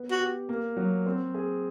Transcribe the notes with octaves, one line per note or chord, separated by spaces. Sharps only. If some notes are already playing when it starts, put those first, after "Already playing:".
Already playing: B3
F#4
G4
A#3
F#3
C4
G#4